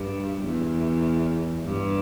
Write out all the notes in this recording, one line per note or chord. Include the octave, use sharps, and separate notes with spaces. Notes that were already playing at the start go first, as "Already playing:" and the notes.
Already playing: G2
E2
G2